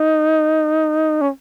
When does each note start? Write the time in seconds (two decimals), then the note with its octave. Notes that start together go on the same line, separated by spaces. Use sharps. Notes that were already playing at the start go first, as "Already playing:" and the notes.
Already playing: D#4
1.21 C#4